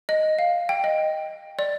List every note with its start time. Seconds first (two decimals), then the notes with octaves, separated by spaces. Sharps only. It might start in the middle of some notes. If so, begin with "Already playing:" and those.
0.09 D#5
0.39 F5
0.69 G5
0.84 D#5
1.59 D5